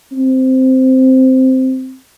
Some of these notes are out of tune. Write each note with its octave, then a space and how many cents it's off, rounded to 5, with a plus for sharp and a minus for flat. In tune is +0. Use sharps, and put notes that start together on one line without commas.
C4 -5